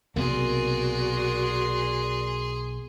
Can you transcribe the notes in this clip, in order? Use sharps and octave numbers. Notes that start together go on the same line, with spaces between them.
B1 C3 A#3 F#4 G#4 A#4 D5 C6